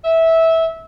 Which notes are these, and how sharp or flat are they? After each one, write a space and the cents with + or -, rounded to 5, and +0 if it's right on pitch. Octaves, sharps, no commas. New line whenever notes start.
E5 -15